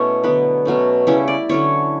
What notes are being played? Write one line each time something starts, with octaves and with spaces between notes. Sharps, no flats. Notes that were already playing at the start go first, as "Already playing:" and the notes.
Already playing: B2 A3 C#4 E4 C#5
D3 F#3 B3 B4
B2 F#3 A3 C#4
C#3 G3 C#4 E4 C#5
D5
D3 F#3 C#4 E4 C#5